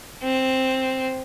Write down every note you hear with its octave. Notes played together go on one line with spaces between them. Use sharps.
C4